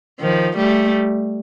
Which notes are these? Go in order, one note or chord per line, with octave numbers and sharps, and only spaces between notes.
D#3 F3
G3 A3